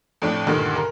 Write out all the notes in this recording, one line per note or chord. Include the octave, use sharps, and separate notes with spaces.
F2 A2 D4
D2 G2 A#2 D3 D#3
A#4